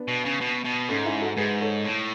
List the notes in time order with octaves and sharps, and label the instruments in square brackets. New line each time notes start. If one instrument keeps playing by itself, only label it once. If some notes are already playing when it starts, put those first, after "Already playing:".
Already playing: [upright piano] B3 D4
[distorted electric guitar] B2
C#3
B2
B2
[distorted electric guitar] G#2 [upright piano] A3 C#4
[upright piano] C#4 E4
F#4 A4
[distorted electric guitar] G#2 [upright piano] G#4 B4
[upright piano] A4 C#5
[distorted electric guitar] A2